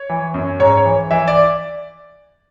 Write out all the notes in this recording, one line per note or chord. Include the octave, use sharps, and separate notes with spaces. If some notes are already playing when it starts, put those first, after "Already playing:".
Already playing: C#5
E3
F#2
G#2 C#5
C#5
E3
E3 E5
D5